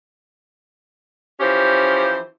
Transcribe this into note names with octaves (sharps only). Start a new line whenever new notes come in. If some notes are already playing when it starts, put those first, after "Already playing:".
E3 F3 C#4 G4 C5